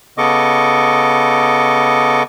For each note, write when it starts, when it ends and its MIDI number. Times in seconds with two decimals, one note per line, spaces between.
0.18 2.23 49
0.18 2.23 59
0.18 2.23 69
0.18 2.23 75
0.18 2.23 85
0.18 2.23 86